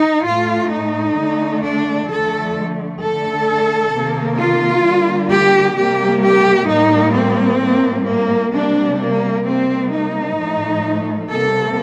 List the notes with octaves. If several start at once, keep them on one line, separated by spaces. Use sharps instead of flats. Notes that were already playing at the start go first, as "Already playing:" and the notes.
Already playing: D#4
A2 A3 F4
D#4
D3 A3
D4
D3 F3 A3 A4
D3 A3 A4
C3 D#3 A#3
F4
D3 G3 A#3
G4
C3 G3 A#3 G4
G4
A2 G3 A#3 D#4
C4
A2 G3 A#3
A#3
C3 G3 A#3 D4
A#3
C3 G3 A#3 C4
D#4
A2 F3 A3
C3 G3 A#3 A4